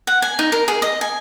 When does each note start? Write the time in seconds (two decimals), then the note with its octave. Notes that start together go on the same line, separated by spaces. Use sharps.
0.07 F#5
0.22 G#5
0.39 D#4
0.52 A#4
0.68 G#4
0.82 D#5
1.01 G#5